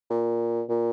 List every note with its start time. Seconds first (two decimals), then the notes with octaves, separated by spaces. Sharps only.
0.10 A#2
0.69 A#2